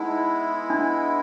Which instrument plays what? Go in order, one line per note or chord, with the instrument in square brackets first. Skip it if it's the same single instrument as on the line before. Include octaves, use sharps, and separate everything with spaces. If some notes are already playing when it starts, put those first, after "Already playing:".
Already playing: [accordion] G#3 B3 E4 [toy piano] D#4
[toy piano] D4